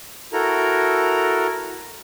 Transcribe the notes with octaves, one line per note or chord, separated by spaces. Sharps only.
E4 F#4 A4 A#4 A#5